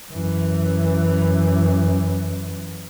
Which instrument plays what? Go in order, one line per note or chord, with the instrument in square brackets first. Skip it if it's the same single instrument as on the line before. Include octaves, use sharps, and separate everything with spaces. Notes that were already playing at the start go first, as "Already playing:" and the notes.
[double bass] F#2 E3